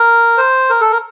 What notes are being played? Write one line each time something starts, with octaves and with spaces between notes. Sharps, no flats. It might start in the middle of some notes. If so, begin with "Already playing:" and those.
Already playing: A#4
C5
A#4
A4
A#4